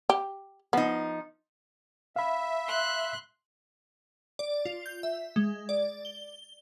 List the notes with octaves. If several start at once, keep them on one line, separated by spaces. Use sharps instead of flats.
G4
F3 B3 D#4
E5 F5 B5
C6 F#6
D5
F4
G6
E5
G#3
D5
G7